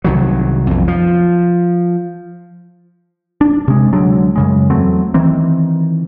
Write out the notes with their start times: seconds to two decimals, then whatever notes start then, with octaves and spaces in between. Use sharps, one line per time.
0.04 C2 D#3 F#3
0.67 B1 F2
0.88 F3
3.41 D4
3.68 C3 G#3
3.93 D2 F#3 G#3 D4
4.36 F#2 C#3 G#3
4.70 E2 F#3 A3 C4
5.14 D#3 E3 C4